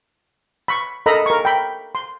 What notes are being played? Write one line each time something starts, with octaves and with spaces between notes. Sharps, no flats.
B5 C#6
A4 A#4 D#5 A#5 B5
A#4 C#6
G5 B5
C6